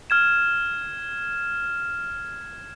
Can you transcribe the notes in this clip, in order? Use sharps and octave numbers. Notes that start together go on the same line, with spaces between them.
F6 G#6 E7